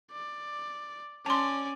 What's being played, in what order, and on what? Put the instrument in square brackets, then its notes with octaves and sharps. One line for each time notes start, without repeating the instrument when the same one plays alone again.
[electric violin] D5
[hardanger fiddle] C#4 [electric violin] D5 [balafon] A5 C6